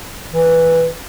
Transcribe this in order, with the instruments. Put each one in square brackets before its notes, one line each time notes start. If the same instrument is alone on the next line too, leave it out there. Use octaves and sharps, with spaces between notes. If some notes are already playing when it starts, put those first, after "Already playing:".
[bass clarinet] E3